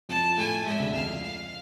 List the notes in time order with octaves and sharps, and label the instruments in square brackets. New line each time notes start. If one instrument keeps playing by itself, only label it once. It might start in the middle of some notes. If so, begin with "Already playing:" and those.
[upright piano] F2 F3 [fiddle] A5
[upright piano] A2 A3 [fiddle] G#5
[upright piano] G#2 G#3 [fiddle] E5
[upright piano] D2 D3
[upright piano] F2 F3 [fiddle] F5
[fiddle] F5